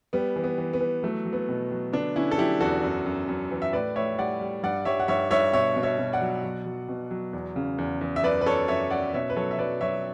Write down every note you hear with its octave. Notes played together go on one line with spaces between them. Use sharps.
G3 B3
E3
B3
E3
B3
E3
F#3 A3
F#3
B3
B2
F#3
D3 B3 D4
D3 C#4 E4
A4
F#3 E4 G4
E2 F#4 A4
F#2
F#2
F#2
E3
E5
A2 B4 D5
A2 C#5 E5
G3 D5 F#5
G3
G2 D5 F#5
G3 C#5 E5
F#5
G2 C#5 E5
G2 C#5 E5
B2 C#5 E5
B2
C#5 E5
B2
D5 F#5
F#3
F#3
F#3
B2
F#3
E2
C#3
E2
E2
E5
F#2 B4 D5
B4
F#2 A4 C#5
F#2 C#5 E5
F#2 D5 F#5
B2 C#5 E5
B4
F#3 A4 C#5
E5
F#3 B4 D5
F#3 C#5 E5